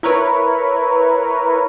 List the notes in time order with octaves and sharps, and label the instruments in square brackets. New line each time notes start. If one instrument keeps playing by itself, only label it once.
[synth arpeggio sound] E4 A#4 B4 C#5